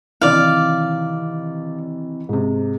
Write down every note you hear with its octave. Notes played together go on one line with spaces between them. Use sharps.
C3 D#3 E3 D5 F5
G#2 C3